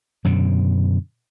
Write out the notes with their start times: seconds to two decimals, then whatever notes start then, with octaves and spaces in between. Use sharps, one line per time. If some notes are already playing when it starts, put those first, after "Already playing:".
0.25 F#2 B2 D3